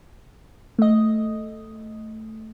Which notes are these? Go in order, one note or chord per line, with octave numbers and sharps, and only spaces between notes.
A3 D#5